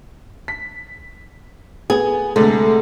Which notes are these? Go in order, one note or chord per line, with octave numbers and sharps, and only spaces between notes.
B6
B3 G#4
D2 C3 G#3 A3